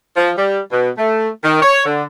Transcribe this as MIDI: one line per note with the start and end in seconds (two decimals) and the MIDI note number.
0.16 0.31 53
0.37 0.59 55
0.71 0.89 47
0.97 1.28 57
1.44 1.62 51
1.62 1.83 73
1.86 2.03 50